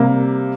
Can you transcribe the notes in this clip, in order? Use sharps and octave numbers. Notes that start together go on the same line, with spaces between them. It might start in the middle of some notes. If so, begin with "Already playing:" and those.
Already playing: C3 G3 A#3